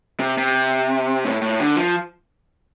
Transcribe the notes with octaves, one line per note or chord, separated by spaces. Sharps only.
C3
C3
A2
A2
D3
F3